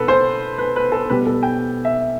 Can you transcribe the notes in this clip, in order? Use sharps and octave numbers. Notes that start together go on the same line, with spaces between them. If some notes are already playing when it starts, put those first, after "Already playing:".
Already playing: B2 A4 B4
C5
B4
B4
A4
B2 G3 B4
A4
G5
E5